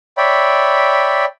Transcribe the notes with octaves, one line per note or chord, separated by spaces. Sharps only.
C#5 D5 E5 G5 B5